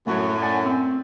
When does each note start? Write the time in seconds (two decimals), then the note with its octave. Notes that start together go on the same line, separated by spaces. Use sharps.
0.07 F#2 A2 A3 F#4 C#5
0.42 D5 F#5 G#5
0.66 C4